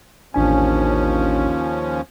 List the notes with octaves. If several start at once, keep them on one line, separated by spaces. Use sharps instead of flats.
A1 D#2 F3 C#4 D4 G#5